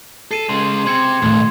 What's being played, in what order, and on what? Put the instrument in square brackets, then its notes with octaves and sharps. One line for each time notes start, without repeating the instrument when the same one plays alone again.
[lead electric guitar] A4 [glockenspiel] C7 D#7 E7
[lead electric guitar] C#3 G#3 [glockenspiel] C6
[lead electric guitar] C3 [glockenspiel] C6 G#6 C#7
[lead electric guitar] B1 [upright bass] A2 D#3